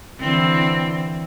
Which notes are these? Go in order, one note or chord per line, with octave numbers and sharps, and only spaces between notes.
D3 E3 C4